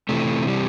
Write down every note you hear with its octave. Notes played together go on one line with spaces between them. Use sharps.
C3 E3 A3
G3